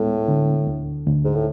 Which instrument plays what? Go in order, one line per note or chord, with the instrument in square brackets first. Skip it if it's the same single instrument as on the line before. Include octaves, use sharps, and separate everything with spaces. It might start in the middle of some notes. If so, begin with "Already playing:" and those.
Already playing: [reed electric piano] D2 G#3 B3 [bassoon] A2
[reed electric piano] D3
D2
D2
[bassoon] G#2
A2